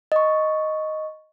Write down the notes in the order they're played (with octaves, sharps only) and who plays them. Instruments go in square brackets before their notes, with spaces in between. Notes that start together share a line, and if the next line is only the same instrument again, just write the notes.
[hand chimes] D#5 C#6